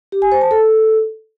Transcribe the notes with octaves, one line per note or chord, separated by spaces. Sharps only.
G4
G#5
C5
A5
A4